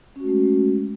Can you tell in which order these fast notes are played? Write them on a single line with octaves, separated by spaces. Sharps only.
C#4 F#4 A3 G#3